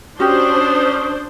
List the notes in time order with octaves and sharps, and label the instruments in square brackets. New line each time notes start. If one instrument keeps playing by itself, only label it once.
[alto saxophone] C#4 [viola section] D4 C5 [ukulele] F#4 G4 [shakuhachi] D#6